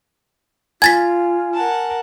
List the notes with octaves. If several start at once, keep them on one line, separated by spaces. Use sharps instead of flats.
F4 G#5 G#6 A6 B6
A#4 F#5 A5